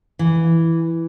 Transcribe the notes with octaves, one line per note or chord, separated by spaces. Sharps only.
E3